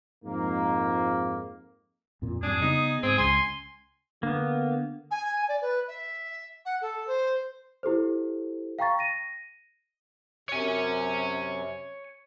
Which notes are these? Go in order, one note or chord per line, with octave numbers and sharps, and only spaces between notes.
F2 G#2 A#3
F2 A#2
F2 G#2 G3 D4 G#4
C#3 B3 D#4
G#2 C4 G#4
C#2 G#3 G#5 C6
D3 A#3 B3
G#5
D5
B4
E5
F#5
A4
C5
E4 G4 A4 C5
F5 G5 A#5 C#6 A6
A#6 D#7
F#2 C3 C#5 G#5